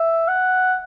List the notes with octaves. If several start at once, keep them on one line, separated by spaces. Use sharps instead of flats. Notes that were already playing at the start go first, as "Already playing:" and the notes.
Already playing: E5
F#5